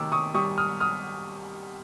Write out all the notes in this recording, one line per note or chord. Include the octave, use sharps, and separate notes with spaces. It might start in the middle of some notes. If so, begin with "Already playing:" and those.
Already playing: C3 D#3 D6 E6
C#6 D#6
G3 C#6 D#6
D#6 F6
D#6 F6